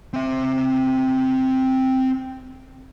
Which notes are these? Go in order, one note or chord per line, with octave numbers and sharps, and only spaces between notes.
C4 E5